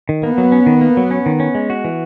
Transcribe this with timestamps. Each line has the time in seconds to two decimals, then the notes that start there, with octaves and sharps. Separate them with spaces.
0.09 D#3
0.23 A#3 B3
0.38 F#3
0.52 C#4
0.66 D#3
0.81 A#3
0.97 F#3
1.11 C#4
1.26 D#3
1.40 C#4
1.55 G#3
1.70 F#4
1.84 E3